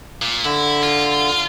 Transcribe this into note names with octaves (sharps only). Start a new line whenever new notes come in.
A#2
D3 E4
F4